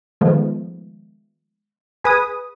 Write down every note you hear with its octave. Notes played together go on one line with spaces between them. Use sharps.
D#3 F3 G#3 A3 B3
G#4 B4 G#5 D#6